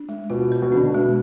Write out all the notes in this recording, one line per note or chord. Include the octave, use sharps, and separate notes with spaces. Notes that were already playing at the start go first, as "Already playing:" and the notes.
Already playing: D4
G#3
B2 F4
B4
B2
D3 D4
B2
G#3